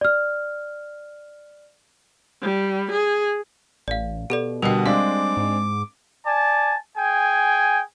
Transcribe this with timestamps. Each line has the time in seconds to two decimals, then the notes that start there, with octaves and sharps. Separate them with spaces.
0.01 D5 F6
2.42 G3
2.91 G#4
3.88 A1 D5 F5
4.30 B2 G4 A4 D5
4.62 B2 D3 G3 A#4 D#5 G5
4.86 G#3 C4 D4 F5 D6
5.37 G#2
6.27 D5 G#5 A5
6.98 G#4 G5 G#5